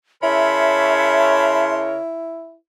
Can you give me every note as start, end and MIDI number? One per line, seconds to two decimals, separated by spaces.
0.23 1.98 49
0.23 2.55 64
0.23 1.98 70
0.23 1.98 73
0.23 1.77 76
0.23 1.85 81
0.23 1.85 83
0.23 1.85 84